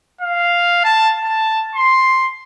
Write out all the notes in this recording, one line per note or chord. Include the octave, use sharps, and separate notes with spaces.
F5
A5
A5
C6